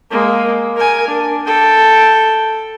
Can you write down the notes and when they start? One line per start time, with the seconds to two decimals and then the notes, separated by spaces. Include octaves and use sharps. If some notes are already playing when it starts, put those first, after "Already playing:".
0.10 G#3 A#3
0.76 A#4 G#5
1.08 D4
1.46 A4 G5